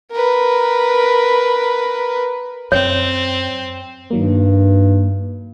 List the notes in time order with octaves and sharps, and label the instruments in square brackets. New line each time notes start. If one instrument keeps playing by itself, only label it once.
[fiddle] A#4 B4
[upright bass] F#2 [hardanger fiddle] C4 [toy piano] C#5
[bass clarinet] G2 [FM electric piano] D#3 F#3 A#3